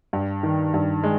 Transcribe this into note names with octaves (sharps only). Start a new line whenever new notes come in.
G2
D#3
G2
G#3